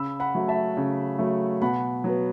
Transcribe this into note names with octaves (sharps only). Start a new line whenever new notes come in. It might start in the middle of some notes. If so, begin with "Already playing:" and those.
Already playing: C#3 B5 E6
F#5 B5
F#3 A3
E5 A5
C#3
F#3 A3
B2 F#5 B5
F#3 B3